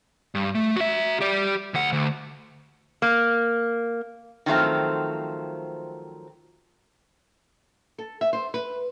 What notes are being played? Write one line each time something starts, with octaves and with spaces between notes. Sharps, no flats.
G2
A3
F#4 E5
G4 D5
D2 F#5
D2
A#3
D#3 F3 F#3 A3 C4
A4
E5
C5
B4